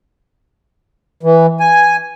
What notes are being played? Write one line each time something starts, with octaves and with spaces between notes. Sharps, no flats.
E3
G#5